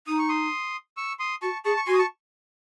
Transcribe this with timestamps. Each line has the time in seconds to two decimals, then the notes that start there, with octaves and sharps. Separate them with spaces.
0.07 D#4 D#6
0.18 C#6
0.29 C6 D#6
0.97 C#6 E6
1.19 C6 D#6
1.42 F#4 A5 C#6
1.65 G#4 A5 C#6
1.77 C#6
1.87 F#4 G#5 C6
1.93 D#6
1.98 A5 C#6